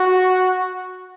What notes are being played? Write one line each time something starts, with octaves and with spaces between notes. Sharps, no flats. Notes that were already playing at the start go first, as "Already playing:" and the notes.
Already playing: F#4